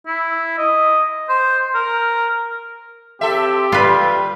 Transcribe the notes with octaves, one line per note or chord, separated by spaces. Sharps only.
E4
D#5
C5
A#4
C4 G4 A4 E5
G3 F4 B4